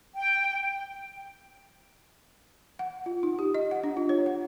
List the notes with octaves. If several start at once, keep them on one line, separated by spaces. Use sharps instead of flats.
G5
F#5
F4
D#4
G4
D#5
F#5
D4
F4
C#5
F#5